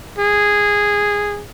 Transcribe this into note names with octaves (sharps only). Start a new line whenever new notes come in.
G#4